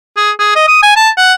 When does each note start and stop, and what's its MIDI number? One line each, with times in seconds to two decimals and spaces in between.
0.17 0.31 68
0.39 0.54 68
0.55 0.65 75
0.68 0.81 87
0.83 0.95 80
0.96 1.09 81
1.18 1.33 78